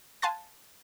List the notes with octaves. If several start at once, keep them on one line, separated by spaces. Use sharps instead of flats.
F5 G#5 A5 C6 F#6 A6